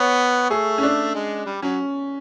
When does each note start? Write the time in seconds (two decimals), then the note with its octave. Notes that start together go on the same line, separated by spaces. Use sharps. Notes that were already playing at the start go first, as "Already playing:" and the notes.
Already playing: B3 C#5
0.50 A3 G#4
0.78 C#4
0.83 D4
1.15 G#3
1.46 G3
1.62 F#3 C#4